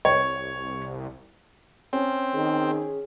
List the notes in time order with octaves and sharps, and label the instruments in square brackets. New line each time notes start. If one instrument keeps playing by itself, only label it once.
[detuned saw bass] C2 [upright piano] C#5
[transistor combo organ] C4 [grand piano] C#4
[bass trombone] D#3 [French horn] G#4